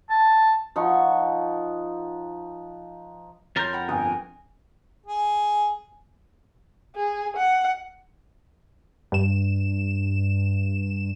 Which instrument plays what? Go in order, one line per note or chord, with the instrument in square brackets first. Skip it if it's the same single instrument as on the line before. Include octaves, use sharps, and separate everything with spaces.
[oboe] A5
[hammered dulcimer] F3 D#4 F#5 C#6
[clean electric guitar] F2 A#4 A#5 [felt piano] C#5 C6 [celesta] G6 A6
[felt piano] F#5 G5 B5
[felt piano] G1 G2 D#6 [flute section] G5 G#5
[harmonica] G#4
[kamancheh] G#4
F#5
[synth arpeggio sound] G2 E7